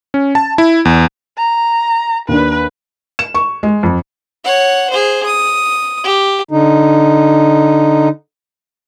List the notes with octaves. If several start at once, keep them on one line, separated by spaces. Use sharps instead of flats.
C#4
A5
E4
E2
A#5
D#2 D4 B4
E7
C#6
G#3
F2
C#5 F#5
G#4 C5
D#6
G4
D3 D#4